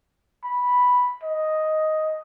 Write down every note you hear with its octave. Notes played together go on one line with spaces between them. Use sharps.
B5
D#5